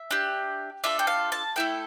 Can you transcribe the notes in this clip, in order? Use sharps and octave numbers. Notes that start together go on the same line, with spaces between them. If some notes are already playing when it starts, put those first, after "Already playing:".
Already playing: E5
D4 G4
D4 F4 A4 E5
G5
F5
A5
A3 E4 A4 G5